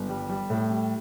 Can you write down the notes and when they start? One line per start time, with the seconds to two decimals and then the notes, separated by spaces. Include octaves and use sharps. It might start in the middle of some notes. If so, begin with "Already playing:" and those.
Already playing: G1
0.09 G3
0.30 G3
0.50 A2
0.71 G3